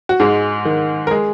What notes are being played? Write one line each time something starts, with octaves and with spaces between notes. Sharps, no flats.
F#4
G#2 G#3 G#4
D#3
A#4
G#3 G#4